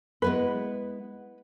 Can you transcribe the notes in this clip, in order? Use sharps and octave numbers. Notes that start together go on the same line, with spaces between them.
G#3 B3 E4 B4